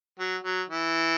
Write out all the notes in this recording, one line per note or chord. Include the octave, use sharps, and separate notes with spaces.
F#3
F#3
E3